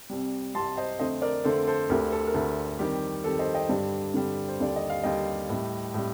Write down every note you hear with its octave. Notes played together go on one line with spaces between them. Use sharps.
C2 C3 G3
C2 C3 G3 A5 C6
C5 D#5
F2 D3 A3 C5 D#5
A#4 D5
F2 D3 A3 A4 C5
A4 C5
D2 D3 A3 G4 A#4
A4
A#4
D2 D3 A3 A4
F2 D#3 G3 G4
F2 D#3 G3 A4
C5 D#5
D#5 G5
G2 D3 G3
G2 D3 G3
C5
D#2 D3 G3 D5
D#5
F5
D#2 D3 G3 D#5 G5
A2 G3
A2 G3